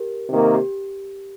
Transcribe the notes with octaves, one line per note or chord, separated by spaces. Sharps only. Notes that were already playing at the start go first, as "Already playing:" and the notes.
Already playing: G4 A#4
C3 D#3 A#3
G4